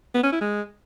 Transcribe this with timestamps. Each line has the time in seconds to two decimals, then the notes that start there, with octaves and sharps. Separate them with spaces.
0.15 B3
0.24 C#4
0.32 E4
0.41 G#3